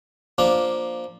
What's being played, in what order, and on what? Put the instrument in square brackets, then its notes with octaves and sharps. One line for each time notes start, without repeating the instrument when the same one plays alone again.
[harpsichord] F3 A#3 D4